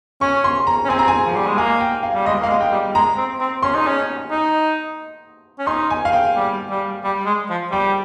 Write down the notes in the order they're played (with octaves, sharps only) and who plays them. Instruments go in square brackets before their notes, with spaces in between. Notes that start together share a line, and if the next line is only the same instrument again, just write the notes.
[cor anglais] C#4 [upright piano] C#6
[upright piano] C6
A#5
[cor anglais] C#4
[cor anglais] C4 [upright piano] G#5
[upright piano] A#5
G#5
[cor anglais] F3
G3
G#3
[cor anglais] A#3 [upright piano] G#5
[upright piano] G5
F5
[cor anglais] G3
[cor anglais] G#3 [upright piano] D#5
[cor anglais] A#3
[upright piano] F5
[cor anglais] G#3
[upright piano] G5
[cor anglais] G3
[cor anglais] G#3 [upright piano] A#5
[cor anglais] C4
C4
[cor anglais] C#4 [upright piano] C6
[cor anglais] D#4
C#4
D#4
C#4
[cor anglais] D#4 [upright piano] C6
[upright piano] G#5
F5
G5
[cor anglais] G3
G3
G3
G#3
F3
[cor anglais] G3 [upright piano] G5